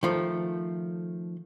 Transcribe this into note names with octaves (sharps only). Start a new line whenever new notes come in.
D#3 F3 A3